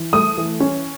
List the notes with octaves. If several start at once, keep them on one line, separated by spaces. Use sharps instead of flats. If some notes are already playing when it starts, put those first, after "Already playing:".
Already playing: E3
A3 D#6
E3
C#4